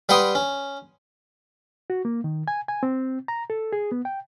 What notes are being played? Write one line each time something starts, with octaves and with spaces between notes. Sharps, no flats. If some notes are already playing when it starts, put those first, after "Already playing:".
G3 B4 F#5 G5 C6 D#6
C#4
F#4
A#3
D#3
G#5
G#5
C4
A#5
A4
G#4
B3
G5